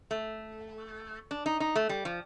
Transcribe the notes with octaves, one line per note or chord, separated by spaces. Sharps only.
A3
D4
D#4
D#4
A3
G3
F3